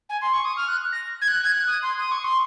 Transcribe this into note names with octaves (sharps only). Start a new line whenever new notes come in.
G#5
C6
C#6
D#6
F6
F#6
A#6
G#6
F#6
G#6
F#6
D#6
C6
D#6
C#6
C6